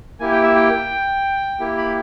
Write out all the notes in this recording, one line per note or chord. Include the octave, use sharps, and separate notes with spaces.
A#3 E4 G4 G#5
G5
E5
G5
A#3 E4 G4
B5